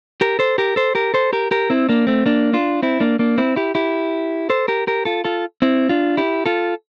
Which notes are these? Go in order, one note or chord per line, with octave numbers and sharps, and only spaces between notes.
G4 A#4
A4 C5
G4 A#4
A4 C5
G4 A#4
A4 C5
G4 A#4
G4 A#4
C4 E4
A#3 D4
A3 C4
A#3 D4
D4 F4
C4 E4
A#3 D4
A#3 D4
C4 E4
E4 G4
E4 G4
A4 C5
G4 A#4
G4 A#4
F4 A4
F4 A4
C4 E4
D4 F4
E4 G4
F4 A4